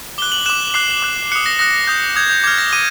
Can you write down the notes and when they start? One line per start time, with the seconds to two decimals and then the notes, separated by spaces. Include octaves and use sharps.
0.18 D6 F#6 G7
0.32 F#7
0.46 D6 F#6 E7
0.74 D6 F#6 C7
1.02 D6 F#6
1.31 D#6 F#6 C#7
1.46 A#6
1.59 D#6 F#6 A#6
1.87 D#6 G6
2.16 D#6 G6 G#6
2.30 G6
2.44 D6 F6 G#6
2.58 A#6
2.73 D6 D#7